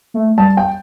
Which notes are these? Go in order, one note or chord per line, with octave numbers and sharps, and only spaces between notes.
A3
G3 A5
G5